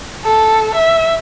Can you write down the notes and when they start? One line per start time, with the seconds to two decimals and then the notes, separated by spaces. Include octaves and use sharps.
0.24 A4
0.75 E5